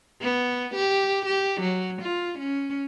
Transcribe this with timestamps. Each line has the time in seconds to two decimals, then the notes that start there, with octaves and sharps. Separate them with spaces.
0.21 B3
0.75 G4
1.25 G4
1.61 F#3
2.01 F4
2.39 C#4